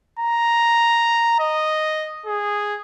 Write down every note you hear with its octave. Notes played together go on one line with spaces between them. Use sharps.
A#5
D#5
G#4